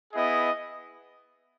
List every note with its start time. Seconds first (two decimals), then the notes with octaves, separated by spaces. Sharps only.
0.13 B3 E4 G#4 D#5